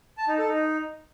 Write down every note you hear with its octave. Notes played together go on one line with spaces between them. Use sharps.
A5
D#4
A4
D#4